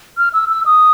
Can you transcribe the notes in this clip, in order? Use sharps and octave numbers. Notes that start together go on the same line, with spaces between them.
F6
E6
E6
D#6